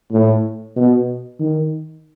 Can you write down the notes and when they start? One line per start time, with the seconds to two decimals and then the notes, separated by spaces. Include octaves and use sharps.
0.11 A2
0.76 B2
1.39 D#3